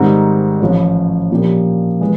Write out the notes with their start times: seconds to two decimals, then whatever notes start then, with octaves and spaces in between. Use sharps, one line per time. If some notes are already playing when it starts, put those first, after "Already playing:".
Already playing: G#2 D#3 G3 C4 D#4
0.61 A1 A2 F3
1.31 A#2 F3 A#3 D4 G4
2.01 E3 G#3